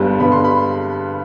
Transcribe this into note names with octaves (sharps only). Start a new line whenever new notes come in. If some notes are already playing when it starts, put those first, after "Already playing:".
Already playing: G1 G2 D3 G3 B3
G1 G2 D3 G3 B3 B5
C6
B5